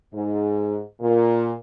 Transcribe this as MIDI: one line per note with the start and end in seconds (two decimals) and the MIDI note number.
0.13 0.80 44
1.00 1.53 46